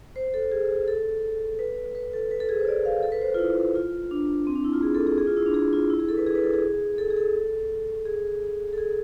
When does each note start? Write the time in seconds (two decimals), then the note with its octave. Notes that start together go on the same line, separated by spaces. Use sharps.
0.16 C5
0.34 A4
0.52 G#4
0.88 A4
1.59 B4
1.95 B4
2.13 A4
2.31 B4
2.40 A4
2.49 G#4
2.59 C5
2.68 D5
2.85 F5
3.03 A4
3.12 B4
3.21 C5
3.30 F4 B4
3.39 E4
3.56 F4
3.75 F4
4.11 D4
4.47 C4
4.55 D4
4.64 E4
4.73 F4
4.83 G#4
4.95 A4
5.07 G#4
5.18 G#4
5.27 F4
5.37 E4
5.46 D4
5.54 G#4
5.73 F4
5.90 E4
5.99 G#4
6.08 A4
6.17 B4
6.26 G#4
6.35 B4
6.44 A4
6.54 G#4
6.98 A4
7.10 G#4
7.17 A4
8.06 G#4
8.73 A4
8.78 G#4